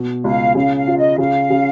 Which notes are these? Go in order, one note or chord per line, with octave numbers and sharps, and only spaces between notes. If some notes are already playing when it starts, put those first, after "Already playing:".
Already playing: B2
C#2 F5
C#3 F5
F5
F4
D#5
C#3 F5
C#3